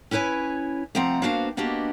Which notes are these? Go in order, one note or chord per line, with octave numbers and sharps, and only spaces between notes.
C#4 E4 B4 C#5 G#5
C3 F3 A3 C4 F#5 A#5
A#3 B3 D4 F#4 C5 F5
A#3 B3 D4 F#4 G4 D#5